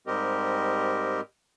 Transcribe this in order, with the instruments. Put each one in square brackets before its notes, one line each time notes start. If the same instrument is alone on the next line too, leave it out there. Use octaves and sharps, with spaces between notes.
[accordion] G#2 G3 C4 G4 A#4 D#5